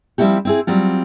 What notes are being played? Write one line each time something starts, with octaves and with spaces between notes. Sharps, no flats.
F3 G3 C4 E4 F#4 G4
C4 E4 G#4
F#3 G3 C4 F4